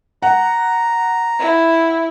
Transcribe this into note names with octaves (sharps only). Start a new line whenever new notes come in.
F#5 A#5
E4